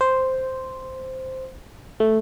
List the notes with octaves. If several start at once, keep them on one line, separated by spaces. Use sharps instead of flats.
C5
A3